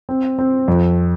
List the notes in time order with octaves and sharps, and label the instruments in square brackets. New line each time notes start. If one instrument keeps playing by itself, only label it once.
[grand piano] C4
C4
F2